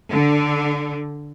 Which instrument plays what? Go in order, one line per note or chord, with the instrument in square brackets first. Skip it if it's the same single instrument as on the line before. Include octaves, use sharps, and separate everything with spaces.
[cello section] D3